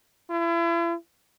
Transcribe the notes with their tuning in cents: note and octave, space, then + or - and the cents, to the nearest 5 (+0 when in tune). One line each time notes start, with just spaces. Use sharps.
E4 +40